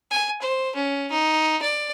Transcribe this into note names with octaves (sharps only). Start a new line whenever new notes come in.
G#5
C5
C#4
D#4
D5